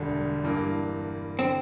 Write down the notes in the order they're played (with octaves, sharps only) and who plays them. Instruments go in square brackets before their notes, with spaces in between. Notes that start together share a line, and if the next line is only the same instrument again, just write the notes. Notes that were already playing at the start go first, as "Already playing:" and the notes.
Already playing: [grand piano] E1 D2 D3 G3 [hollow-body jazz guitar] D4
[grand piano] G2 E3 A#3
[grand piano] D3 [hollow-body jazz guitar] C4